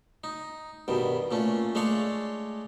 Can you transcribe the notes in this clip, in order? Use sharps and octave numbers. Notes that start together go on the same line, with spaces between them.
D#4
G2 B2 D#3
A#2 A3 C#4
G#3 A3 D4 C#5 F5